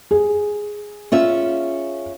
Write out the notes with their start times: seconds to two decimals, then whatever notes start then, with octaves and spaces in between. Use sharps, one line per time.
0.11 G#4
1.12 C#4 F4 E5